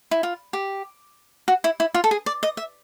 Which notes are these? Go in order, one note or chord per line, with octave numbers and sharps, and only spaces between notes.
E4
F4
G4
F#4
E4
E4
F4
A4
G#4
D5
D#5
E5